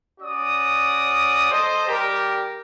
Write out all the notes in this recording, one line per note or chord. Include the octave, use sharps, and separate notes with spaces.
C#4 F#4 D5 D#6
A4 C5 D#5
G3 G4 A#4